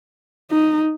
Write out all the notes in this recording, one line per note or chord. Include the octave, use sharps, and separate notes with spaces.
D#4